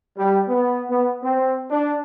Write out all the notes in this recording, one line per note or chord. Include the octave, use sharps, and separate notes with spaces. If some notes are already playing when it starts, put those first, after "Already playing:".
G3
B3
B3
C4
D4